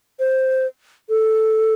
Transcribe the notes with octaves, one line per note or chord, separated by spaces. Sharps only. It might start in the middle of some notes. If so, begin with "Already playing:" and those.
C5
A4